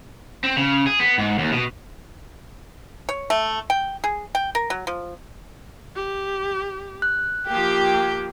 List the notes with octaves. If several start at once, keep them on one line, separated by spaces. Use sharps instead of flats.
C4
C#3
G#4
B3
G#2
D#2
B2
C#5
A3
G5
G#4
G5
A#4
F#3
F3
G4
F#6
F3 A#3 G4